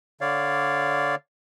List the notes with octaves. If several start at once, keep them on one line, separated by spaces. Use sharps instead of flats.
D3 C#5 D5 F5